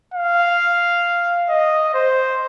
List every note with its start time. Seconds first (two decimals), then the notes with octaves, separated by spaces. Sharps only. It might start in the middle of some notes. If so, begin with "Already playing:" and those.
0.14 F5
1.49 D#5
1.94 C5